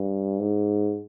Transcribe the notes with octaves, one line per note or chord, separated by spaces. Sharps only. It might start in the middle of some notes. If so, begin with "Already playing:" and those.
Already playing: G2
G#2